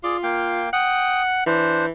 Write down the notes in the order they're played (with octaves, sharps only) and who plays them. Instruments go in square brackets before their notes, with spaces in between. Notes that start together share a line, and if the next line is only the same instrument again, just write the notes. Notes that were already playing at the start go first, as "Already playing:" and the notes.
[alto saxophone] F4 [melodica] G#4 D5 D6
[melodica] A#3 F5 G5
[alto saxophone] F#5 [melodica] G5 D#6
[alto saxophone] E3 [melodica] D4 C5